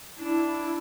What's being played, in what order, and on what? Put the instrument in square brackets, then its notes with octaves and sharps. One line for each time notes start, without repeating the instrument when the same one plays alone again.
[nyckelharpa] D4 [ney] E4